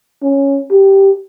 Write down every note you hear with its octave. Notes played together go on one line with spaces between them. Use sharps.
C#4
G4